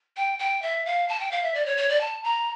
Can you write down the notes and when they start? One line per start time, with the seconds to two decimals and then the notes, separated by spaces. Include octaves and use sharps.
0.17 G5
0.39 G5
0.62 E5
0.86 F5
1.08 A5
1.20 G5
1.31 F5
1.43 E5
1.54 D5
1.66 C#5
1.77 C#5
1.89 D5
2.01 A5
2.24 A#5